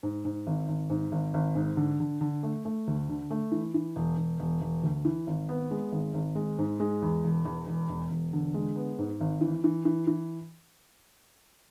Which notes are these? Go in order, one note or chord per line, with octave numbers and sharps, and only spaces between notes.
G#2
G#2
G#1
G#1
G#2
G#1
G#1
G#2
D3
D3
D3
A3
A3
D2
D3
A3
E3
E3
E1
E1
E1
E1
D2
E3
G#1
B3
G#3
G#1
G#1
G#3
G#2
G#3
E2
E1
E2
E1
E1
E1
D3
G#3
B3
G#2
G#1
E3
E3
E3
E3